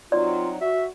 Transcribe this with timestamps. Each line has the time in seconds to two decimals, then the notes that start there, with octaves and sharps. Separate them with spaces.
0.12 F#3 C4 D#4 F4 D5
0.61 F#4 E5